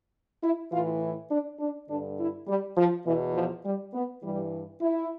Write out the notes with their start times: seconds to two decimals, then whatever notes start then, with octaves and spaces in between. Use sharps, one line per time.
0.42 E4
0.72 A2 E3 F4
1.01 E4
1.30 D4
1.60 D4
1.89 G2 D3 D4
2.18 E4
2.47 G3
2.77 F3
3.06 E2 B2 E3
3.35 F3
3.64 G3
3.93 B3
4.22 G2 E3 G3
4.81 E4